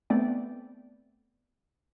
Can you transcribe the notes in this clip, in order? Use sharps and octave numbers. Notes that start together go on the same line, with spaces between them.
A3 B3 C4 D5 G5